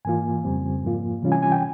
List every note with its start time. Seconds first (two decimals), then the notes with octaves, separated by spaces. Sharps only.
0.05 G#2 E3 A#3 F4 G#5
0.44 F2 C#3 G3 C4
0.83 G#2 F3 A#3 F4
1.22 C3 E3 G3 C#4 F4
1.32 G#5
1.42 G#5
1.52 G5